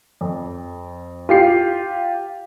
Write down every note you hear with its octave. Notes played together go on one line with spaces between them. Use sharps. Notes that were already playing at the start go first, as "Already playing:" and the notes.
F2
F4 G4 C7